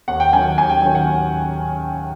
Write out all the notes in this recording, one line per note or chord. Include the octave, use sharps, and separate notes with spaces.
D#2 F#5
G5
D#3 F#3 G#5
D#2 G#5
G5
D#3 F#3 G5
F#5
D#2